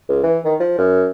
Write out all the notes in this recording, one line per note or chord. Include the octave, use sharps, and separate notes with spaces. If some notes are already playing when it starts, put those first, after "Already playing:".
C#2
E3
D#3
F3
F#2